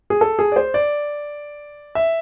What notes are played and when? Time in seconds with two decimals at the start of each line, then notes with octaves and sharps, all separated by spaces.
0.10 G#4
0.21 A4
0.39 G#4
0.52 D5
0.56 C5
0.74 D5
1.95 E5